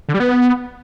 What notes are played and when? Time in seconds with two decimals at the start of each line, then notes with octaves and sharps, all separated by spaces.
0.09 D3
0.14 G3
0.20 B3